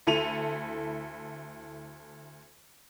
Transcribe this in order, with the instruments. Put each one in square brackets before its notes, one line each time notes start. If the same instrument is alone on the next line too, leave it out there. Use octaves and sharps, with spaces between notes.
[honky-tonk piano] D2 E4 A4 D#7 F7